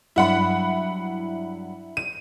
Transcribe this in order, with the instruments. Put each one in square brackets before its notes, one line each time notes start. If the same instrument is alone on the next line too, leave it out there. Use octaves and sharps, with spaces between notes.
[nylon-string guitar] G2 F#3 D4 [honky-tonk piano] E4 F#5 B5
[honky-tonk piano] D#7